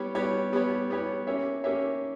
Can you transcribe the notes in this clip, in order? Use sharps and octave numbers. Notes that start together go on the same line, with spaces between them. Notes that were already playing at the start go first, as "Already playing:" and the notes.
Already playing: G3 B3 G4 C#5
G3 B3 G4 C#5
G3 B3 G4 C#5
G3 B3 G4 C#5
A#3 C#4 G4 C#5 E5
A#3 C#4 G4 C#5 E5